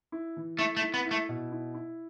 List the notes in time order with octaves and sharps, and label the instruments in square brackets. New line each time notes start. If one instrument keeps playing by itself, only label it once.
[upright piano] E4
E3
[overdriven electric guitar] A3 [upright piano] E4
[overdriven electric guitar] A3
[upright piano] E4
[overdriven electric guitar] B3
[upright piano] E4
[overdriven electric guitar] A3
[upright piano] B2
E4
E4